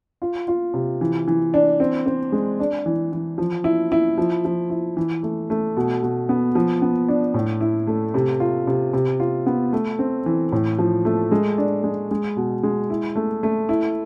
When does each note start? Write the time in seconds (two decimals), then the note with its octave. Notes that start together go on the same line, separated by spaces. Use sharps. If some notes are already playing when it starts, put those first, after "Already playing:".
0.22 F4
0.48 F4
0.74 C3
1.01 E3
1.27 E3
1.54 D4
1.80 C4
2.06 C4
2.32 G#3
2.60 D4
2.86 E3
3.13 E3
3.38 F3
3.64 E4
3.92 E4
4.18 F3
4.45 F3
4.70 E4
4.97 E3
5.23 A3
5.50 A3
5.77 B2
6.03 B2
6.29 B3
6.55 F3
6.82 B3
7.08 D4
7.34 A2
7.61 E4
7.87 A3
8.14 C3
8.40 F4
8.67 C3
8.93 C3
9.20 F4
9.46 B3
9.73 A3
9.99 C4
10.26 E3
10.52 A2
10.78 F3
11.05 A3
11.32 G#3
11.58 D4
11.83 G#3
12.11 G#3
12.37 B2
12.63 G#3
12.90 E4
13.16 A3
13.43 A3
13.69 E4